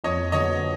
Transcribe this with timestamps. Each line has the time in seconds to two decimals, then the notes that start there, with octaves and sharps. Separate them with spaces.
0.04 F2 C#5 D#5
0.32 D3 F#3 B3 C#5 D#5